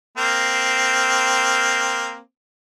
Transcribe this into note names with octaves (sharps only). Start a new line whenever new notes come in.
A#3 C4